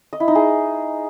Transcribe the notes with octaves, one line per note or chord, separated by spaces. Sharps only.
D#5
E4
D#4
G#4